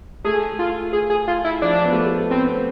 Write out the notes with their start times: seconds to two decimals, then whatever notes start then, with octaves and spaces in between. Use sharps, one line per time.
0.25 A3 G#4
0.59 F4
0.93 G#4
1.10 G#4
1.28 F4
1.44 E4
1.62 F3 D4
1.85 B3
1.92 A3
2.00 B3
2.07 A3
2.30 B3 C4
2.47 C4